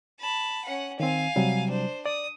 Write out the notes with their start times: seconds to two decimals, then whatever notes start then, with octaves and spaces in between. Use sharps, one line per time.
0.20 A5 B5
0.65 C#4 F#5
1.00 D#3 C4 F5 G#5
1.36 C3 F#3 G3
1.69 D4 C5
2.06 D5 D#6